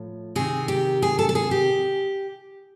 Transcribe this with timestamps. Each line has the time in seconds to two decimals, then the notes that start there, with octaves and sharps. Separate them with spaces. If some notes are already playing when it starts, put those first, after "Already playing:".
Already playing: A2 F3
0.35 C3 D#3 G#4
0.68 G4
1.02 G#4
1.19 A4
1.29 A4
1.35 G#4
1.51 G4